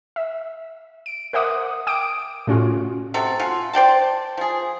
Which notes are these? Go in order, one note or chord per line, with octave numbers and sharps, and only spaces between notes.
E5
D7
A#4 C5 E5 F#5 D6 D#6
G5 D6 D#6 D7
A2 C#4 F4 F#4
C3 F#4 A4
C#4 F4 F#4
C5 D5 G5 A5
F3 G#4